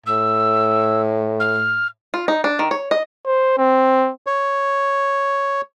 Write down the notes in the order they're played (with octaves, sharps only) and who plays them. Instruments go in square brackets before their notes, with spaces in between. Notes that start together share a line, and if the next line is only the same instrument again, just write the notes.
[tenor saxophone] A2 [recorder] E6
[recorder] F6
[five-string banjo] F4
D#4
D4
D#3
C#5
D#5
[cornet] C5
C4
[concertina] C#5